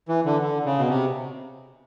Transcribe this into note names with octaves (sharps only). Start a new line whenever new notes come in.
E3
D3
D3
C#3
B2
C3